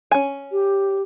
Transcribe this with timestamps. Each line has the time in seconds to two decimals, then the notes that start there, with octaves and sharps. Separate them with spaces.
0.11 C#4 G#5
0.52 G4